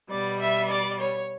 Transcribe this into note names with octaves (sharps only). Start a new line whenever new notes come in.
B2 G3 B3 D5
E5
D5
C#5